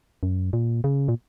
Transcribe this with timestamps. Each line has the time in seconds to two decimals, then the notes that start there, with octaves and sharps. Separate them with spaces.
0.23 F#2
0.53 A#2
0.84 C#3
1.08 A#2